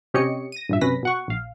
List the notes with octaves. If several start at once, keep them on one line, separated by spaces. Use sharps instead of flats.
C3 C#4 G4 C#5 D#5 C#7
A#6 D#7
G2 A#2 E5
F#2 C3 C#4 B4 A#6 B6
B2 F#5 C#6
A#1 F5